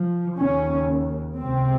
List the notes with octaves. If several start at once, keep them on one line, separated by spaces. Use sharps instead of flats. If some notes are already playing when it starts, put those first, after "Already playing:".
Already playing: F3
D#2 C#3 C#4
C#2 C3 C4